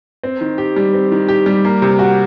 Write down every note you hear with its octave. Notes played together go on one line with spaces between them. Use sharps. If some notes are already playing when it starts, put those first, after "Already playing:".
C4
D#3
G4
G3
C4
D#3
G4
G3
A#3
C3
F#4